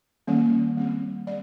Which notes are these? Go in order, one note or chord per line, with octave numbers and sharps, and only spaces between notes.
D#3 G3 A#3 C#4
G3 C4
G3 D5